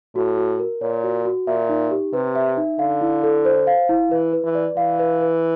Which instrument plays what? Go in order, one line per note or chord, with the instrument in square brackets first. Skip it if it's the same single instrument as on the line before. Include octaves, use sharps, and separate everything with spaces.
[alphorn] A2 [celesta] F#4
[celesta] F#4
A#4
[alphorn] A#2 [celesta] C#5
[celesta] F#4
F#4
[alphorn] A#2 [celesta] E5
[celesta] D#4
G4
[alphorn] C3 [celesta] B4
[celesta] E5
D#4
[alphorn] D3 [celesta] F5
[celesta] E4
A4
C5
F5
E4
[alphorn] E3 [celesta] B4
[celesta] B4
[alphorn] E3
[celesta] D5
[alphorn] E3 [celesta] F5
[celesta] B4
B4